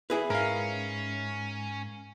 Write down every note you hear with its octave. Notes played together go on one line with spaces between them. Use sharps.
E4 G#4 B4
G#2 C#4 A#4 F5